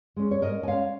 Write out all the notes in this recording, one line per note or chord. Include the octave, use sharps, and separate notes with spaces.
G#3 C#4
C#5
G#2 A#4 D#5
G#5
G#3 C#4 C#5 F5